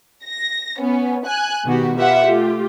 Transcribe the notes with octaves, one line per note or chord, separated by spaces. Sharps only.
A#6
B3 C#4
G#5 F#6
B2 D#3 B3 F#4 G4
F4 G4 B4 E5 F#5
A3 F4 G4